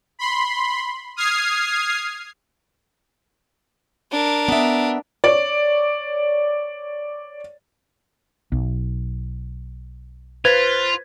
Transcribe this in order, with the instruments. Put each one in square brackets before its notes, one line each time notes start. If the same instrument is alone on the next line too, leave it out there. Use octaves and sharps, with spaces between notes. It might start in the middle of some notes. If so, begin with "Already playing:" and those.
[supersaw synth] B5 C6
D#6 F6 G#6 C7
[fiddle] D4 A#4
[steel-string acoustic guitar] B3 E5
[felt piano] C#5 D5
[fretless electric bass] B1
[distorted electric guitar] F4 [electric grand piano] B4 G#6 [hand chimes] C5 A6 B6